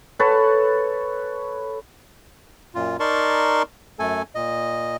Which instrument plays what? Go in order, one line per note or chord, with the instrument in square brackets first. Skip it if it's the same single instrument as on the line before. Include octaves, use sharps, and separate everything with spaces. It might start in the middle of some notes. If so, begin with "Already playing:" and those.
[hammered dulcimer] A4 B4 C#5 A5
[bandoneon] F#2 A#2 F4
D#4 A#4 D5 A5 C6 C#6
F#2 A3 A4 G#5
A#2 D#5